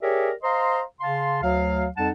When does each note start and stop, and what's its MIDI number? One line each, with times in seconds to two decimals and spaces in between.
0.02 0.31 67
0.02 0.31 68
0.02 0.31 70
0.02 0.31 73
0.02 0.31 74
0.02 0.31 76
0.43 0.81 72
0.43 0.81 75
0.43 0.81 77
0.43 0.81 82
0.43 0.81 84
1.01 1.42 49
1.01 1.42 77
1.01 1.42 81
1.01 1.42 84
1.43 1.87 38
1.43 1.87 54
1.43 1.87 77
1.97 2.10 41
1.97 2.10 55
1.97 2.10 63
1.97 2.10 78
1.97 2.10 81